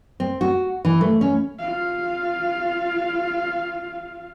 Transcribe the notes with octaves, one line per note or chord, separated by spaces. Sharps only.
C4
F#4
E3
A3
C#4
F4 F5